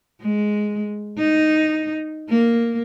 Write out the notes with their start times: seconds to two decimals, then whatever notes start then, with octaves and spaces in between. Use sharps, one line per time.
0.21 G#3
1.18 D#4
2.29 A#3